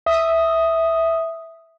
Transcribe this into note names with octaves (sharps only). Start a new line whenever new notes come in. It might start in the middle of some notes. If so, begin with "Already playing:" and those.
E5 D#6